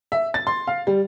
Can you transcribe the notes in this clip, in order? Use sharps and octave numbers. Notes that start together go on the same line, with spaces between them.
E5
A6
C6
F5
G3